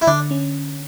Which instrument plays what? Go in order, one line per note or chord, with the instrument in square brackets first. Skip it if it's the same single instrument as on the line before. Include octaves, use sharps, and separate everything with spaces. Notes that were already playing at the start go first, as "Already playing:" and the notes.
[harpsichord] E4
[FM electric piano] D3 [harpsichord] D4
[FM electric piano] C#4